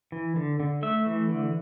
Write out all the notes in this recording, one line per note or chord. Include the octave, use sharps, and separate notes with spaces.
E3
D3
D3
A3 E5
E3
D3